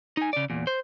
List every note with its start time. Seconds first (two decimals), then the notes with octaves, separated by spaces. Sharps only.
0.17 D#4 G#5
0.33 C#3 D5
0.50 E2 A#2
0.67 C5